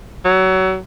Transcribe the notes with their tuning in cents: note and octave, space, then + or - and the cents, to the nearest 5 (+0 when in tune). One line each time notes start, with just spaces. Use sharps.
F#3 +25